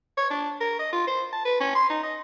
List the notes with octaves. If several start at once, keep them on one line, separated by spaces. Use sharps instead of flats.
C#5
D4
A#4
D#5
F4
C5
A5
B4
C#4
C6
D#4
D#5